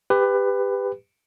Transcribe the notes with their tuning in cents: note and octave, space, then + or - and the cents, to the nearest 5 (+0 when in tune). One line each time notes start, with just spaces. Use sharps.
G4 +20 B4 +15